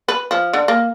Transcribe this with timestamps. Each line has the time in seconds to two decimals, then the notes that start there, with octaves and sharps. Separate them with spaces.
0.08 B4
0.31 F3
0.53 D3
0.68 A#3